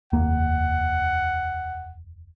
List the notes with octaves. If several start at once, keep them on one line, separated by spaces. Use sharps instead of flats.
F1 D#2 A#3 F#5